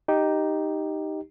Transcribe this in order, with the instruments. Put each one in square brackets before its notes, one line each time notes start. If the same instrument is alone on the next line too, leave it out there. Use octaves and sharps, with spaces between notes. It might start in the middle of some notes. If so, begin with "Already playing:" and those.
[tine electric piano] D#4 G4